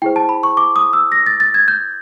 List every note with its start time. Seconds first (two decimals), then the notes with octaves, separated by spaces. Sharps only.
0.02 E4 G#4 C5 G5
0.16 A5
0.29 B5
0.43 C#6
0.57 D6
0.76 D#6
0.93 E6
1.12 A#6
1.26 A6
1.40 A6
1.54 G#6
1.68 G6